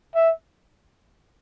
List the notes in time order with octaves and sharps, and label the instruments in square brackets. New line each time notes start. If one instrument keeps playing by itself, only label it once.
[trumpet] E5